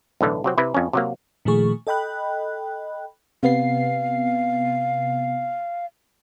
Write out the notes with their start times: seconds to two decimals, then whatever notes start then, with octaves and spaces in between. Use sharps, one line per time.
0.21 B1 A2 D3 E3
0.44 C3 F#3 C4
0.58 C3 E4 B4
0.74 F2 C#4
0.93 C3 F#3 A#3
1.45 A#2 D#3 F3 A3 G#4 C#6
1.87 A4 D#5 G5 B5 F#6
3.43 C3 B3 F5 C7